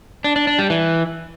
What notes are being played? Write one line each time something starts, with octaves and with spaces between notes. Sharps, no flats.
D4
D4
D4
G3
E3